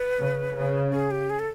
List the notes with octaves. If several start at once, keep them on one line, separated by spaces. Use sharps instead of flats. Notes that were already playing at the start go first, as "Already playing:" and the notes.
Already playing: B4
C#3
C#3
G#4
G4
G#4
A4